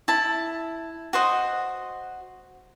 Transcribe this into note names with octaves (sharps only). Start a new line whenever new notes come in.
E4 A5
F#4 C5 D#5